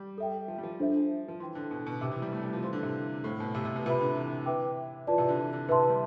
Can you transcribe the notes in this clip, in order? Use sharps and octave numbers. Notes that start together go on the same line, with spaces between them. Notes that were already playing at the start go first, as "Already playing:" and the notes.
Already playing: G3
A4 E5 G5
F3
G3
F3
D4 A4 C5 E5
F3
E3 C5 G5 C6
D3
B2
B2
C3 C5 E5 G5 D6
E3
G3
A3
G3
F3
E3 A4 C5 F5 C6
D3
C3
A2 A4 C5 F5
B2
C3
C3
B2
C3 F4 B4 E5 B5
D3
E3
B4 E5 G5 D6
E3 F4 B4 D5 A5
C3
D3
E3
D3
C3 B4 E5 A5 C6
E3
G3